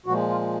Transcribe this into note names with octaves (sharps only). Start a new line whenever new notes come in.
A#2 F3 G#3 F#4
F4